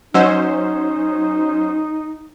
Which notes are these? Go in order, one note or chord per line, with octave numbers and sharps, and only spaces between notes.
F#3 C#4 D#4 C5 D#5 F#5 E6